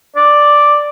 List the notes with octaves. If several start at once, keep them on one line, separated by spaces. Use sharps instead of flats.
D5